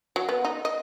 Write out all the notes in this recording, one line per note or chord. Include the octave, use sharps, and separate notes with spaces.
F#3
B3
D#4
D#5